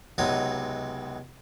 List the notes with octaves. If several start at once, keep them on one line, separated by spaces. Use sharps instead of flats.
C#2 C3 F#3 B3 D#4 D#6